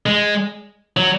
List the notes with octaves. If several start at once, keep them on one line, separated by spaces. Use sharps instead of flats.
G#3
F#3